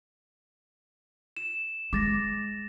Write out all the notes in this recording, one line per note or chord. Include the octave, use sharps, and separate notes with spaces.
E7
G#3 D6 A6 A#6